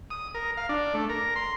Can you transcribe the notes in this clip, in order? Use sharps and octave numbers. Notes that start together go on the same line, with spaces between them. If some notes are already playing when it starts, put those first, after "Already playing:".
D#6
A#4
F5
D4
A3
A#4
C6